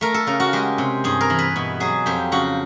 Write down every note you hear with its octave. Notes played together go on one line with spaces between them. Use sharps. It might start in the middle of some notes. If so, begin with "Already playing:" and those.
A3 A#4
A4
C#3 A#4
F#4
G#3 G4
C3
G2 G#4
A#4
E3
B4
B2
F#3 G#4
F2 G4
C#3 F#4